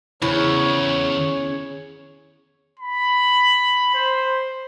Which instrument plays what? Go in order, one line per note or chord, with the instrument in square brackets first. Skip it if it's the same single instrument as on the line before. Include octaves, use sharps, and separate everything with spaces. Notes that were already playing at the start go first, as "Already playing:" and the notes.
[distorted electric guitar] E2 [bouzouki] C#3 [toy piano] E4 C5 B5 [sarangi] C#5
[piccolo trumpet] B5
C5